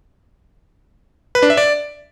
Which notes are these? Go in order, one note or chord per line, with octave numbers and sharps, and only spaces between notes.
B4
D4
E5
D5